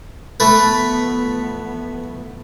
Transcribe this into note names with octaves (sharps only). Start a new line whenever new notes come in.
A1 F3 A3 B3 B4